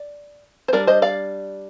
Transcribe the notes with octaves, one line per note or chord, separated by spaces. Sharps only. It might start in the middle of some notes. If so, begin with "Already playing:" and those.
Already playing: D5
C5
G3 D4 A#4 D5
C5 D#5
D5 F5